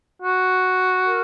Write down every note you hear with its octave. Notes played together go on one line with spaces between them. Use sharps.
F#4
A#4